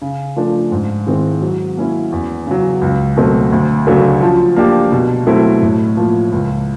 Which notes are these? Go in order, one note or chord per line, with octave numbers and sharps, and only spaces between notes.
C#3
F3 A3 D4
G#2
D#3 G#3 C4 E4
F#3
A#3 C#4 E4
E2
C#3 F#3
C#2
B2 F#3 A3 C4
D2
C#3 F#3 A3 D4
F3
A#3 D4 G4
B2
F#3 A3 C4 E4
A2
F3 A#3
C#2